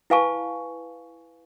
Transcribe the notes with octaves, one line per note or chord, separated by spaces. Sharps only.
E4 B4 F5 G#5 A5 C#6